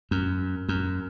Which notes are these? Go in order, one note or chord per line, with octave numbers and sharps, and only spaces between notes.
F#2
F#2